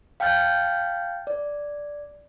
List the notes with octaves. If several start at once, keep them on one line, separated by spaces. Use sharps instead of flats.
F5 G5 A5 F6 G6 A6
D5